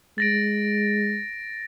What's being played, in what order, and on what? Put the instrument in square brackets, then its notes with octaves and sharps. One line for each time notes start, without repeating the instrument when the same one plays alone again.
[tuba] G#3 [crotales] A6 A#6 D7